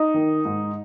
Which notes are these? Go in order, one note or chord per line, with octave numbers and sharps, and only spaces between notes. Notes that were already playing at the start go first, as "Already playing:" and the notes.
Already playing: D#4
D#3
G#2